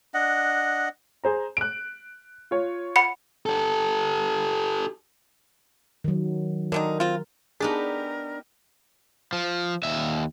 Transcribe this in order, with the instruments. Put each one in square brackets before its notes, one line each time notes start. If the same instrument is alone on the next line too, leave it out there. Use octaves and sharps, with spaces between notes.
[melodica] D4 D#5 F#5
[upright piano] G#4 C5 A#5
F#6 D7
F4 C#5
[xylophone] F#5 B5 C#7
[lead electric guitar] G4 A4
[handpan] D#3 F#3
[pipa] D3 D#3 D#4 [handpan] A#4
[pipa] C4 F4
[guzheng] B3 D#4 G4 [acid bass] D4 [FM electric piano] G#4 [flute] A#4
[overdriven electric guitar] F3
D#2 E5